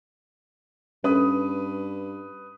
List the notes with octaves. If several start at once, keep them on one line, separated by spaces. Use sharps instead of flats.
G2 C#4 A4 B4 D#6